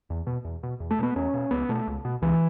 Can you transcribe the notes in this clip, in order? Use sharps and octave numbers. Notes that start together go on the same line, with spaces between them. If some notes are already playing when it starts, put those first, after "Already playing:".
E2
B2
E2
B2
E2
A3
B2 B3
E2 C#4
B2
C#2 B3
B2 A3
C#2
B2
C#2 E3